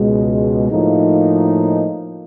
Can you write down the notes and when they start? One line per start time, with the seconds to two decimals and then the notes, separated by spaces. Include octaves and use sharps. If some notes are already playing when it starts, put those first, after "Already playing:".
Already playing: C#2 B2 G#3
0.71 A2 F3 A#3 D#4